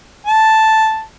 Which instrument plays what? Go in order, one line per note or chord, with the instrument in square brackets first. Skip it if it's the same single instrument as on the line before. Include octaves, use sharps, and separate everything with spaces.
[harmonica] A5